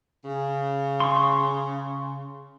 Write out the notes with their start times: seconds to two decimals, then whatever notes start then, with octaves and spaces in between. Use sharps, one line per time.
0.24 C#3
1.00 C6 C#6